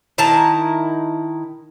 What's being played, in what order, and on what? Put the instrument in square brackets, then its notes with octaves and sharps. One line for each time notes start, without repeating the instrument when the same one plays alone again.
[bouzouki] D#3 E4 A5 A#5